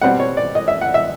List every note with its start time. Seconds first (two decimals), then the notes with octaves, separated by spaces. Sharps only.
0.02 B2 G3 C4 F#5
0.20 C#5
0.37 D5
0.55 D#5
0.68 E5
0.81 F#5
0.94 E5